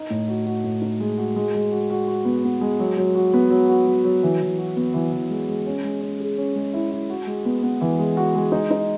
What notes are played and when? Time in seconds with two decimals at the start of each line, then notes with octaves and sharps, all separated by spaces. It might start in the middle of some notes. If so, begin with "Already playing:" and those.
Already playing: D#4
0.10 A2
0.28 F#4
0.46 F#4
0.64 A2
0.82 D#4
1.00 G#3
1.18 F#4
1.36 G#3
1.54 G#3
1.71 F#4
1.90 F#4
2.07 F#4
2.25 B3
2.44 B3
2.61 G#3
2.79 F#3
2.97 F#3
3.15 F#4
3.33 B3
3.50 F#3
3.69 F#4
3.87 F#3
4.04 F#3
4.23 E3
4.41 E3
4.58 F#4
4.76 B3
4.94 E3
5.13 E3
5.30 G#3
5.48 G#3
5.67 C#4
5.84 G#3
6.02 C#4
6.20 G#4
6.38 C#4
6.55 G#3
6.74 E4
6.91 E4
7.10 F#4
7.27 G#3
7.45 B3
7.63 B3
7.81 E3
7.99 G#3
8.17 F#4
8.35 G#3
8.52 D#4
8.71 D#4